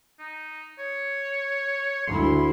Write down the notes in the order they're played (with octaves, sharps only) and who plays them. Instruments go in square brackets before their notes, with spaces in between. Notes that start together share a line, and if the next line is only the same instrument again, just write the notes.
[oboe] D#4
C#5
[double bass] D2 E4 [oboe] C6